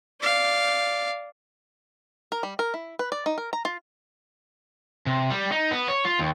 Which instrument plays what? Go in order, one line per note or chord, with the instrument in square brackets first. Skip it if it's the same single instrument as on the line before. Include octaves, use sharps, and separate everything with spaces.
[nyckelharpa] D5 F5
[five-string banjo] A#4
G3
A#4
E4
B4
D5
D#4
A#4
A#5
F4
[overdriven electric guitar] C3
G3
D#4
B3
C#5
F4
D#2